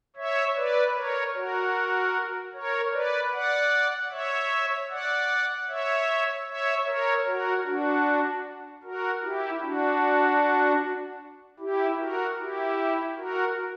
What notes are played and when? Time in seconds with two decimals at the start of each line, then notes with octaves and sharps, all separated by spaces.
0.16 C#5 E5
0.56 B4 D5
0.96 A#4 C#5
1.35 F#4 A#4
2.53 A#4 C#5
2.92 B4 D5
3.32 D5 F#5
4.11 C#5 E5
4.90 D5 F#5
5.68 C#5 E5
6.47 C#5 E5
6.86 A#4 C#5
7.26 F#4 A#4
7.65 D4 F#4
8.83 F#4 A#4
9.23 E4 G4
9.62 D4 F#4
11.59 E4 G4
11.99 F#4 A#4
12.38 E4 G4
13.17 F#4 A#4